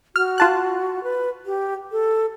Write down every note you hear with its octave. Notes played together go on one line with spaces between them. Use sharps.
F#4 F6
F4 A5 F#6
B4
G4
A4